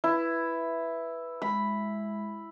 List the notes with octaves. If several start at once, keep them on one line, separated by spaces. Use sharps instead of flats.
E4 B4 E5
G#3 B5